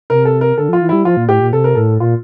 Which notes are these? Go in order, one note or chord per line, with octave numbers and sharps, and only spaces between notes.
C3 A#4
A4
A#4
D3 A4
F3 F4
E3
G3 E4
F3 F4
A#2
A2 G4
A#2
C3 A4
A#4
A2 A4
A#2 F4